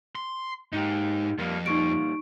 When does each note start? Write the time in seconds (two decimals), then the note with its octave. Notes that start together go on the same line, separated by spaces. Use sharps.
0.16 C6
0.73 G#2 D#4 G4
1.38 F2 G3 A#3
1.66 A#2 G3 D#4 C#6 D7